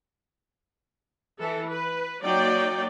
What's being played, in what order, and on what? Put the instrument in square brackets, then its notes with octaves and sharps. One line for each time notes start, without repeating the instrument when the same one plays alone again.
[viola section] E3 A4
B4
F#3 A#3 D#4 F#4 D5 G5